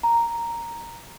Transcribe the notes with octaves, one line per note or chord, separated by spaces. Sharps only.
A#5